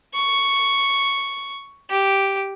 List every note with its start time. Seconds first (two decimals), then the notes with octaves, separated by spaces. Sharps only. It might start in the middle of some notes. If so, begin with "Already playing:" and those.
0.16 C#6
1.91 G4